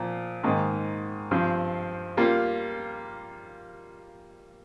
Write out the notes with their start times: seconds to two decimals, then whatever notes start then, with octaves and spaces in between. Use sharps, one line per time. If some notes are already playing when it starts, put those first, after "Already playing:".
Already playing: A#2 F3 C4
0.43 G#2 D#3 A#3
1.31 G2 F3 C4
2.17 G3 A#3 F4